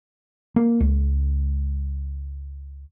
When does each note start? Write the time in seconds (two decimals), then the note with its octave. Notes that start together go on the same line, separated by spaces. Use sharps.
0.56 A#3
0.80 C#2